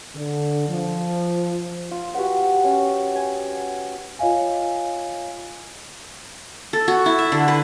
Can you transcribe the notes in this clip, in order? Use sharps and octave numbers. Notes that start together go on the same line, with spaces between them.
D3
F3
F4
F#4 G4 B4 F#5
C#4
G#5
F4 C#5 D#5 F5 G#5
A4
F#4
E4
E5
D3
B4